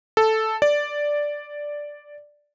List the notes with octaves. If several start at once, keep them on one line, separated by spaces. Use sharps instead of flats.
A4
D5